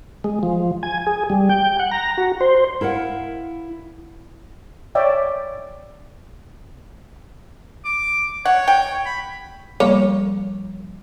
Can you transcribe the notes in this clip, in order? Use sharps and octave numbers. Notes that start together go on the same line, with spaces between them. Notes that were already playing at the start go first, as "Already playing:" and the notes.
G#3
F3
G#5
G#4
G3
G5
F#5
A#5
F#4
C5
E4 A#4 F5 F#5
C#5 D5 E5 G5
D6
C#5 F#5
G5
B5
F3 G3 A#3 C#5